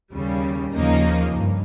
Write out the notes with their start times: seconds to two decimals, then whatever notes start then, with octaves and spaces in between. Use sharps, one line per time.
0.13 D#2 C#3 G3
0.74 D#2 C#3 F3 A#3 D#4
1.34 G2